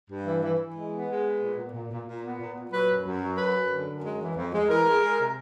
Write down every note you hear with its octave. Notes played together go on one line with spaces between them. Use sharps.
G2
E3
E3
E3
G#3
B3
G#3
B3
A#2
A#2
A#2
A#2
A#2
B3
A#2
A#2
F#3 B4
F#2
F#2
F#3
F#2 B4
F#2
D3
F#2
G#3
E3
F2
G#3
E3 A#4
G#3
G#3
C3